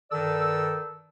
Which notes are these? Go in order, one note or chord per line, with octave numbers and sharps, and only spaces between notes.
G2 D#3 A4 D5 E6